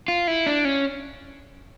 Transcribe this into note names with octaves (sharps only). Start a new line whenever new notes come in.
F4
E4
D4
C#4